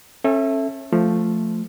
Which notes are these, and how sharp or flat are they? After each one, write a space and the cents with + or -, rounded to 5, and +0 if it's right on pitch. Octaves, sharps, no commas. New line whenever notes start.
C#4 -35 A4 +0 E5 +0
F3 +0 A3 +5